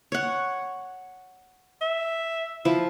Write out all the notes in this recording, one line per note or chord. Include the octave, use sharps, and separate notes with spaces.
C#5 F#5
E5
F3 E4